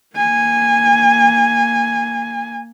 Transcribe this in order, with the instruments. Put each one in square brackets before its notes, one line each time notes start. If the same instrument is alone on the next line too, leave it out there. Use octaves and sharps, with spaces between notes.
[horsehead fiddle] A#3 G#5